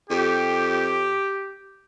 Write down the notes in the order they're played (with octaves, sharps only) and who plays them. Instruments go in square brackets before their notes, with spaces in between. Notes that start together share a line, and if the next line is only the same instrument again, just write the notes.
[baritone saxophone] F2 [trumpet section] G4